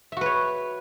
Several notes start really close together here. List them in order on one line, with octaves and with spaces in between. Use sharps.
E5 F#4 B4 C#5